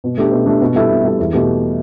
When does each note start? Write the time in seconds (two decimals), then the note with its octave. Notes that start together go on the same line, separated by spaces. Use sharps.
0.04 B2
0.18 A3 D4 G4
0.32 B2
0.46 A3 D4 G4
0.62 B2
0.75 G3 E4 A4
0.90 B2
1.05 G3 E4 A4
1.19 E2
1.33 B2 A3 G4